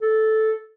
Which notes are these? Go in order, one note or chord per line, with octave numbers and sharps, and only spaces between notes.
A4